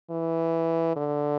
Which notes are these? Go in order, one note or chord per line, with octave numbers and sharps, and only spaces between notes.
E3
D3